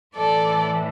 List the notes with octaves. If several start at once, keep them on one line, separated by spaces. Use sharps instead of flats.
A2 E3 A4 D5